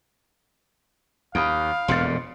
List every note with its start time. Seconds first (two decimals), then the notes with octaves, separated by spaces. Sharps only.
1.35 D#2 F5 B5 D#6 D7
1.88 E1 F2 A#2 C6 A6